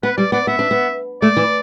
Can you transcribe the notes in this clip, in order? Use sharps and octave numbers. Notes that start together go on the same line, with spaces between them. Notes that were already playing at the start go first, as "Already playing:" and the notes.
B3 B4
G3 D5
B3 D5
B3 E5
D4
B3
A3 D5
E3